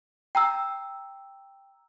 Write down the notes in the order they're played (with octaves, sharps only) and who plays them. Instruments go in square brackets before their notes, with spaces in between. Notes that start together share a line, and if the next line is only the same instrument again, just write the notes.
[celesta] G5 A#5 E6